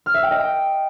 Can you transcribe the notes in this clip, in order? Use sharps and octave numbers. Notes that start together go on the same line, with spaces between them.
F6
E5
G5
D#5
G5